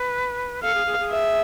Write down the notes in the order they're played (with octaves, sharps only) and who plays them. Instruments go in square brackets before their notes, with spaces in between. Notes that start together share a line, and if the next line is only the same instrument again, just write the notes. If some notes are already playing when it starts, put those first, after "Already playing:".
Already playing: [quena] B4
[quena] A4 [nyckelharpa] F5
[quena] G#4
G#4
G#4
[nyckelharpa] E5